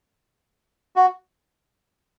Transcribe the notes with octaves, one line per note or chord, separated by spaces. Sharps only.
F#4